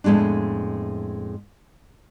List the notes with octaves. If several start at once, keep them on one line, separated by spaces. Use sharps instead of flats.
F2 A2 G#3 B3 D4